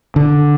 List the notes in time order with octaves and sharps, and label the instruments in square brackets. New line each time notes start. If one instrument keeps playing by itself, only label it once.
[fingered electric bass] D3